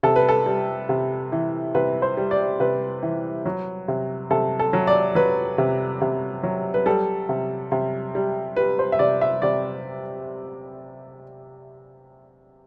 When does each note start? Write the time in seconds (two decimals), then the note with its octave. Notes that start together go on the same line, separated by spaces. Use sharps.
0.03 C3 A4
0.16 B4
0.29 A4
0.46 G3
0.89 C3
1.32 E3
1.75 C3 B4
2.02 C5
2.17 G3
2.31 D5
2.60 C3 B4
3.03 E3
3.46 F#3
3.88 C3
4.31 C3 A4
4.59 A4
4.73 F#3
4.87 D5
5.15 F#3 B4
5.58 C3
6.01 C3
6.43 F#3
6.74 B4
6.86 G3 A4
7.29 C3
7.72 C3
8.15 G3
8.56 G3 B4
8.79 C5
8.92 E5
8.99 C3 D5
9.21 E5
9.42 C3 D5